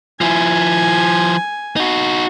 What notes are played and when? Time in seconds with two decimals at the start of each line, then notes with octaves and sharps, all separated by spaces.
0.21 F3 E4 G#5
1.76 D#4 F#4